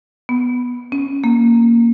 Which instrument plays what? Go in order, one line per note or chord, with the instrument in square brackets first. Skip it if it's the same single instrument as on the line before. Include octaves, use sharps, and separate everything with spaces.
[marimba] B3
C#4
A#3